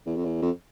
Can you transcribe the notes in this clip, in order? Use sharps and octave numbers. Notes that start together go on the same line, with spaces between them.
E2
F2
E2
F2